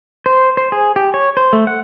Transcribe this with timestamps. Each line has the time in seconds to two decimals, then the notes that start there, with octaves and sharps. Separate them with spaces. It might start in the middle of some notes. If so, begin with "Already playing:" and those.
0.26 C5
0.57 C5
0.72 G#4
0.96 G4
1.14 C#5
1.37 C5
1.53 A3
1.67 F#5